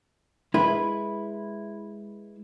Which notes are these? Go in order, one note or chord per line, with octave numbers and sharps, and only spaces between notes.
G#3 E4 B4